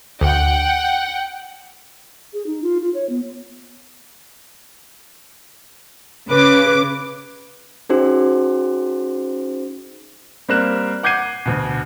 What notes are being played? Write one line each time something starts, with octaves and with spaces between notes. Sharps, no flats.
D2 F#5 G5
G#4
D#4
F4
F4
C#5
B3
C#3 B4 D6
C#4 D#4 F#4 G#4 C5
G3 A#3 C4 A#4 F#6 E7
F#5 D6 G6 G#6 C7 D#7
D2 B2